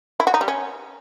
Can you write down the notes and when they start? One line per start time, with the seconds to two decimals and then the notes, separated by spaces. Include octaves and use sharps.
0.20 E4
0.27 F#4
0.34 D#4
0.41 G3
0.48 C#4